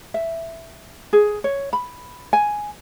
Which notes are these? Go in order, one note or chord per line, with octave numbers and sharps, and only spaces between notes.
E5
G#4
C#5
B5
G#5